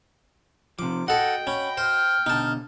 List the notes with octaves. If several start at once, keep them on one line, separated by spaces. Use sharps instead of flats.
C3 F3 D6
F#4 A4 D#5 F#5 G5
C#4 B5
C5 F6
B2 D3 D#4 A5